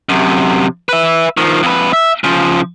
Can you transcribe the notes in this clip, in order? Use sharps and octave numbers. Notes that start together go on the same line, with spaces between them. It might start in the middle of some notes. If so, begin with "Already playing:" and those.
F#2 C3
B4 E5
D#3 F3
F2 B4
E5
C#3 F3